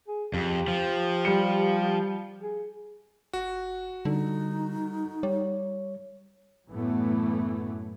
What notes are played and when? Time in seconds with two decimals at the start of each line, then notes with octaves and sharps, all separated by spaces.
0.07 G#4
0.34 F2 G4
0.68 F3
1.25 G3 C#7
2.42 G#4
3.33 G1 F#4
4.05 D3 G3 D#4 A4
5.23 G3 C#5
6.71 F#2 A2 E3 A3 B3